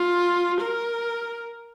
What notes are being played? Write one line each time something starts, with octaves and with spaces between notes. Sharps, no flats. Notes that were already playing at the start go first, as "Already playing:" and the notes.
Already playing: F4
A#4